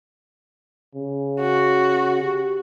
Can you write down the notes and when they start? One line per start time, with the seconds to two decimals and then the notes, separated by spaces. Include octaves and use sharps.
0.95 C#3
1.40 F#4
2.22 G4